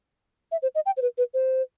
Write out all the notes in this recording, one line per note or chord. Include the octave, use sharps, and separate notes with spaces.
E5
C5
D#5
G5
C5
B4
B4
C5